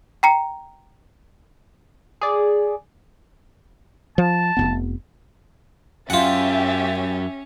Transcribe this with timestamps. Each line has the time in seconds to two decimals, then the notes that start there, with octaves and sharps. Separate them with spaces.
0.23 G5 A#5 C#7
2.21 G#4 D5
4.18 F3 A5
4.57 F1 G2 B3
6.10 F#2 C#4 F4 G4 E5 F#5 A6